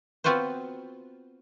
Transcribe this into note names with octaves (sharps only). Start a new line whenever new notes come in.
B3 C4 F4 F#4 B4 C5